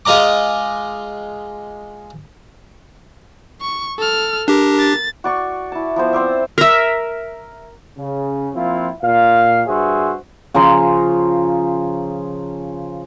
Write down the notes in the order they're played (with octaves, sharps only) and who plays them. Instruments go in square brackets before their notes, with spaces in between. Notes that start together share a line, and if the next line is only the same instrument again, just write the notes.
[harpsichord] G#3 F4 D#5 A#5 D6
[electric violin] C#6
A4 F6
[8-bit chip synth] D4 G4 [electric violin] A#4
[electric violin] A6
[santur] F#4 D5 C#6
E4 A5
F3 B3 C5
C4 C5 D5 E5
[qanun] A#4 E5
[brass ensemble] C#3
F3 A#3 C4 E4 F4
A#2 F5
G2 F#4 G#4 C5 E5
[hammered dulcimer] C#3 F3 A#5 C6